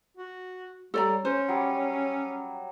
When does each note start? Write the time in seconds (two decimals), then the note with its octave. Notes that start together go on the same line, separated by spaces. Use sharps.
0.17 F#4
0.94 G3 A4 C#5 D5 A#5
1.25 C#4 C5
1.48 F#3 G3